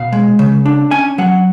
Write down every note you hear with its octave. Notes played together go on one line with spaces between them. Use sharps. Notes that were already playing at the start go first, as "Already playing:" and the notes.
Already playing: B2 F5
G#3
C#3
D4
C#4 G#5
F#3 F#5